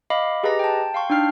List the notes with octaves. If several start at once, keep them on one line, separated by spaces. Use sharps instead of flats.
D#5 F5 B5 D6
G4 G#4 B4 D#5 A#5 A#6
G5 A5
F5 G5 C6 C#6
D4 D#4 G5 F6 C7